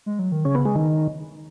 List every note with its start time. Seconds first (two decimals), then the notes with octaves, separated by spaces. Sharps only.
0.06 G#3
0.19 F#3
0.32 D#3
0.45 C#3 C#4
0.55 B3
0.65 G#3
0.75 D#3